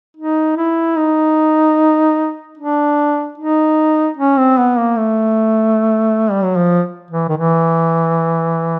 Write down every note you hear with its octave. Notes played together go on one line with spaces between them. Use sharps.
D#4
E4
D#4
D4
D#4
C#4
C4
B3
A#3
A3
G3
F#3
F3
E3
D#3
E3